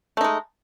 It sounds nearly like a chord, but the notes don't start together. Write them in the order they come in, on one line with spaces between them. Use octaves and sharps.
A3 D#4 G#3